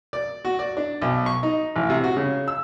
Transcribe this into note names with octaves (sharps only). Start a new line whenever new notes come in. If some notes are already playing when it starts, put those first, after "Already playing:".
D5
F#4
D5
D4
B1
C#6
D#4
A1
C3
F#4
C#3
E6